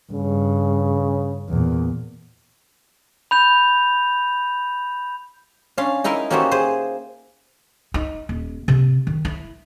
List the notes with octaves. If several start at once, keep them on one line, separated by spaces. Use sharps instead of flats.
G2 C#3
E2 A#2
B5 G6 F7
C#4 D4 F5 C6
D#4 E4 A#4 D#5 F5 C6
A#3 C#4 F#4 G4 A4 C5
G#4 C5
D#4
D#1
C3
D#3
E4